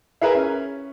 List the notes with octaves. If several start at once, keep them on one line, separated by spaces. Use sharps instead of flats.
E4 G#4 A#4 B4 E5
C#4